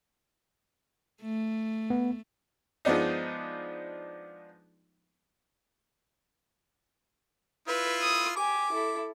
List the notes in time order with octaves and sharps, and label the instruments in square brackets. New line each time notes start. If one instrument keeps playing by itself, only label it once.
[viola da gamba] A3
[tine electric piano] B3
[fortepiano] F3 G#3 B3 D4 D#4
[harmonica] E4 F4 [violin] B4
[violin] D#6
[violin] G4 G#5 [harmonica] D6
[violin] E4 A4